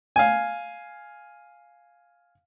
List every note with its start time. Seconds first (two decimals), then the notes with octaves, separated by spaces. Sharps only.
0.16 F5 G#5